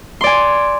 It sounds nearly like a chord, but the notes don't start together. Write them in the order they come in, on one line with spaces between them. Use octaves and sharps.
C6 D5 G#5